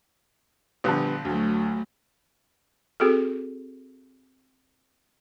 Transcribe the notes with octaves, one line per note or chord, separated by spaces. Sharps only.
A#1 D3 F3 G3 B3
D2 F#3 A3
C4 F#4 G#4 A4